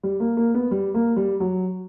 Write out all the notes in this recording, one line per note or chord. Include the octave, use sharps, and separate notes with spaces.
G3
A#3
A#3
B3
G3
A#3
G3
F#3